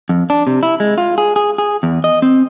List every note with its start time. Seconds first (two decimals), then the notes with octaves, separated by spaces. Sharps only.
0.09 F2
0.30 D4
0.47 C3
0.63 E4
0.80 G#3
0.98 F4
1.18 G#4
1.36 G#4
1.58 G#4
1.83 E2
2.04 D#5
2.22 C4